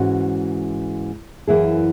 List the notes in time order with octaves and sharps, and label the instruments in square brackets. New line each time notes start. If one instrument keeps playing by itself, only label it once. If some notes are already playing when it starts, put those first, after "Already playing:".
Already playing: [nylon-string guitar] G#2 E3 C#4 F#4
F#2 E3 A#3 E4 G#4